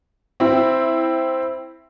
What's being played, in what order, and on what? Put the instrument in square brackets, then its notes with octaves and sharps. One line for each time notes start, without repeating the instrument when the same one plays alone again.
[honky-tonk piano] C4 E4